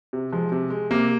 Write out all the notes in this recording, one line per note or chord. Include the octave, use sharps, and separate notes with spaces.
C3
F3 G#3
C3
G#3
C3 A#3